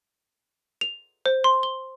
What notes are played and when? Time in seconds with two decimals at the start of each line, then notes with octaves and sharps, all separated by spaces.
0.81 F7
1.26 C5
1.44 C6
1.63 G7